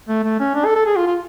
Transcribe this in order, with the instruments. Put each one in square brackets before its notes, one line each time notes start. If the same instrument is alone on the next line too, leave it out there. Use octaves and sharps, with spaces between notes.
[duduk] A3
A3
C#4
D4
A4
A4
G#4
F4
F4